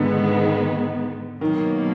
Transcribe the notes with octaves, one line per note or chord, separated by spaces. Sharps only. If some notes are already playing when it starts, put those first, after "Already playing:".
Already playing: G#2 D3 D#3 G#3 B3
B2 D#3 F#3 A#3